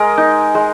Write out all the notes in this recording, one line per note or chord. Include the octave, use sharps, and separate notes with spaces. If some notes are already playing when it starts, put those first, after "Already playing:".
Already playing: G#3 A#4 D#5
D#4
G#3